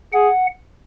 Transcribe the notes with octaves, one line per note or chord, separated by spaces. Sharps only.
G#4 F#5